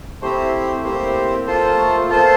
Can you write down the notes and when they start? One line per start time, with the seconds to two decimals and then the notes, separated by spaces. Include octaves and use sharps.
0.22 A3 C4 E4 G4 C5
0.84 A#3 C4 E4 G4 C5
1.47 F4 A4 C5
1.62 A#3
1.77 A3
1.93 A#3
2.09 B3 F4 A4 C5